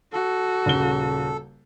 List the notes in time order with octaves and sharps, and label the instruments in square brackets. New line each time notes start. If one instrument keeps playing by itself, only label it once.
[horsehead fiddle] F#4 [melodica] A4
[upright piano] D#1 C#3 G7